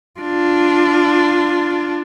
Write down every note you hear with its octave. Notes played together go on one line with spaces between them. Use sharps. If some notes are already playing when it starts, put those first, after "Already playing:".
D4 F4